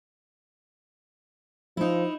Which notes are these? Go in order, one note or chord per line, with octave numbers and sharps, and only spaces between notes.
F3 D#4 E4